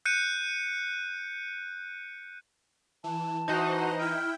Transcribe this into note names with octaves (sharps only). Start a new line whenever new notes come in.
F#6 G6 C#7 D#7
E3 A5
E3 D#4 F#4 C5 D#5 F#5
E4 G5 F6